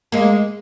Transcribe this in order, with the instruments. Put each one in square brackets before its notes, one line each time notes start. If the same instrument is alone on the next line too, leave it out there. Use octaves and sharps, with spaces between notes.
[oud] G#3 A#3